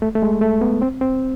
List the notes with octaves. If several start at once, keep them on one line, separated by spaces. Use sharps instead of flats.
A3
A3
G#3
A3
B3
C4
C4